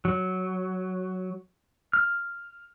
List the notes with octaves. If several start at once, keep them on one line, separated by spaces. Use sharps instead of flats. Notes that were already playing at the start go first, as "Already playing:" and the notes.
F#3
F6